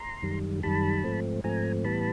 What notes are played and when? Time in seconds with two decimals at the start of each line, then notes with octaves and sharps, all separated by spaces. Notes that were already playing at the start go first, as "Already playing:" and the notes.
Already playing: A#5 C6
0.22 F#2 D#3 G3
0.63 F#2 D#3 G3 A5 B5
1.04 G#2 F3 A3 C4
1.44 G#2 F3 A3 C4 G#5 A#5
1.84 A2 E3 G3 B3 A5 B5